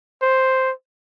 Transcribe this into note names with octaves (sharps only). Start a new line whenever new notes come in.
C5